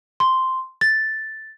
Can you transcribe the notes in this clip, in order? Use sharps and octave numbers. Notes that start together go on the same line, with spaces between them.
C6
A6